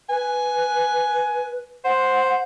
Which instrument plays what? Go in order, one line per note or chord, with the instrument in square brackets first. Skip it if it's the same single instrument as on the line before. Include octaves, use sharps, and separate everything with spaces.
[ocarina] B4 [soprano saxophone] G#5
[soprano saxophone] C5 [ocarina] F#5